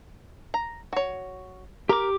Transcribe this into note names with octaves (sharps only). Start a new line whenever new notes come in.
A#5
F#4 C#5
G4 A#4 D6